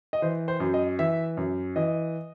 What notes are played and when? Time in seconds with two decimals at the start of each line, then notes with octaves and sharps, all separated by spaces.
0.13 D#5
0.22 E3 C5
0.48 C5
0.60 F#2
0.74 D#5
0.99 E3 E5
1.37 F#2
1.76 E3 D#5